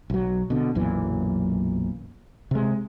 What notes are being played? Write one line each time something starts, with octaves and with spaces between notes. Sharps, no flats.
B1 F#3
B2 D3
B1 F#2 A#2 E3
C3 G#3